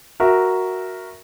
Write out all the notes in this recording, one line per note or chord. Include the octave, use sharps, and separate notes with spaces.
F#4 A#4 E5